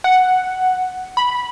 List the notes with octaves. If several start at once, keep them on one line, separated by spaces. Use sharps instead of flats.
F#5
B5